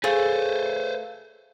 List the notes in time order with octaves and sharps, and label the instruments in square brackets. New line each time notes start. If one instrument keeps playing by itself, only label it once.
[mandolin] A3 [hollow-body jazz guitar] G#4 [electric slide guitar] B4 C5 [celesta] F5